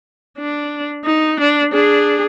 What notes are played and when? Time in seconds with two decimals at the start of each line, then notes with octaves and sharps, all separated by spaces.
0.39 D4
1.05 D#4
1.40 D4
1.74 D4 G#4